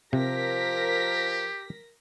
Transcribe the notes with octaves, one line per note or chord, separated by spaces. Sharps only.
C3 F3 G4 A#4 A#6 B6